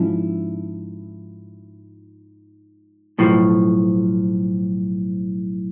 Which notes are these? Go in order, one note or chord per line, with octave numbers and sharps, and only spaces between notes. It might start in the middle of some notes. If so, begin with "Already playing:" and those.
Already playing: G#2 F3 C#4 E4
B1 A2 F3